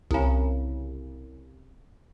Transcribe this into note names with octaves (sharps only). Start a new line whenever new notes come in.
C2 C#3